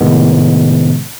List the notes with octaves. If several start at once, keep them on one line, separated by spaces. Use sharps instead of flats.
A2 C3 D#3 G#3 B3